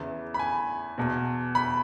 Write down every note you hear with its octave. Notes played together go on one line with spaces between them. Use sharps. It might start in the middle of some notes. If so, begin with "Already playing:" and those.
Already playing: E2 C#3 E3
B5
G#5
E2 B2
B5